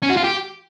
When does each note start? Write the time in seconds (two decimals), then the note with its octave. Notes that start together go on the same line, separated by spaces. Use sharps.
0.02 C#4
0.09 F#4
0.17 F4
0.24 G4